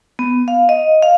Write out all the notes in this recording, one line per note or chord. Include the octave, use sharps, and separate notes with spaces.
B3
F5
D#5
F5